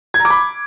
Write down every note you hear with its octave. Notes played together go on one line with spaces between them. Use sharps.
G#6
A#5
D6
B5